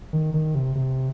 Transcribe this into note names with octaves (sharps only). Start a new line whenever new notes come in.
D#3
D#3
C3
C3